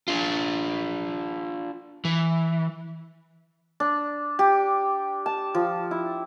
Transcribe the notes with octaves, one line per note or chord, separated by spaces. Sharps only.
D4 F4
E3
D4
G4
A5
F3
E4